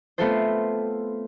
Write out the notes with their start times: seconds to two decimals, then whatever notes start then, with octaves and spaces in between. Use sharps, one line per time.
0.18 A3 B3 C4 F4 A4 C5